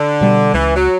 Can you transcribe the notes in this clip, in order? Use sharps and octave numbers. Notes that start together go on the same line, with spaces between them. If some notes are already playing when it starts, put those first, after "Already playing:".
Already playing: D3
B2 G3
C#2 E3
F#3